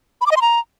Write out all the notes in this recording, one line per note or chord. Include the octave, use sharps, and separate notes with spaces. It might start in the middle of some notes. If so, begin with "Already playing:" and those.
B5
D6
D#5
C6
A#5